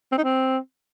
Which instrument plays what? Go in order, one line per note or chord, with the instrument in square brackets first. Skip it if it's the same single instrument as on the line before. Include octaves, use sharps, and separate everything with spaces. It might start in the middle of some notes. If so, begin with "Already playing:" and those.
[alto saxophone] C4
D#4
C4